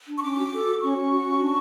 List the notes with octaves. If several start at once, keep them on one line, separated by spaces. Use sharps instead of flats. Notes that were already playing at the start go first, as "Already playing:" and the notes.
D4
C#6
C#4 D6
F#4
A4
F#4
C#4 C#6
C#4
F#4
C#4
D4